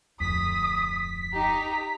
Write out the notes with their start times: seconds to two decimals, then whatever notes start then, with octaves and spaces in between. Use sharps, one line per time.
0.20 D1 F2 D#6 B6
1.33 D#4 G4 A#5